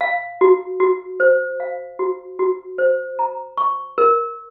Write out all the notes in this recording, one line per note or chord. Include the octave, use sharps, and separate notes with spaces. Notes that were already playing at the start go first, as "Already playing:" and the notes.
F5
F#4
F#4
C5
F5
F#4
F#4
C5
A#5
C#6
A#4